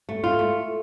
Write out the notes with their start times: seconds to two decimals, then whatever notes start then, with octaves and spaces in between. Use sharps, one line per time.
0.09 A3
0.24 F4
0.39 A3